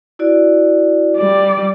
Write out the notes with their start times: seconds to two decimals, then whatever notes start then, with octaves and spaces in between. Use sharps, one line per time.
0.19 E4 F#4 D5
1.17 G3 D5